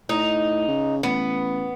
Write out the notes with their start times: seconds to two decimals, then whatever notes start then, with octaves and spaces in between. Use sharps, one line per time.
0.09 A2 D#4
0.68 C#3
1.03 A1 B3